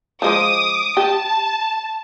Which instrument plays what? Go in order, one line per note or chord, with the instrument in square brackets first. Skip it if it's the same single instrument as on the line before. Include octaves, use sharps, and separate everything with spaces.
[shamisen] F3 G#3 C5 [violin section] D6 D#6
[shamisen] G4 [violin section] A5